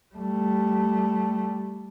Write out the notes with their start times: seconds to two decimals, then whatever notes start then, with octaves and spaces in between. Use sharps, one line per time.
0.15 G3 A3